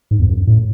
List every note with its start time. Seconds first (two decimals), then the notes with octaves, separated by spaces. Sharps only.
0.11 G#2
0.19 E2
0.29 F#2
0.47 A2